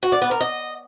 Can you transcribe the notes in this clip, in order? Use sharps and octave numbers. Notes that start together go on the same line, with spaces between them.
F#4
D5
B3
A#4
D#5